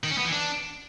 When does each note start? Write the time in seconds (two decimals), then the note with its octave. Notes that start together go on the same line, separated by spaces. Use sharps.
0.04 D#3
0.11 C#4
0.18 B3
0.25 E3
0.32 D4